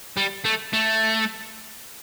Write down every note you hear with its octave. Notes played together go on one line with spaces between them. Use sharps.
G3
A3
A3